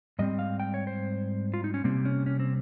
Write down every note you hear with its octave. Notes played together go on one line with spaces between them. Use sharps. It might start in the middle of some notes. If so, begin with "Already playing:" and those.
G#2 G3 C4 D#5
F5
G5
C#5
C5
F4
D#4
C#4
C3 G3 A#3 C4
C#4
C#4
C4